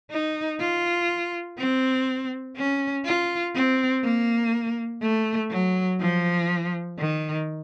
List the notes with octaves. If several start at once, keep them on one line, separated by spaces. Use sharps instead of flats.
D#4
F4
C4
C#4
F4
C4
A#3
A3
F#3
F3
D#3